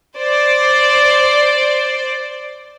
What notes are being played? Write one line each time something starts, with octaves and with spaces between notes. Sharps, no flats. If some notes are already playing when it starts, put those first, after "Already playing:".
C5 D5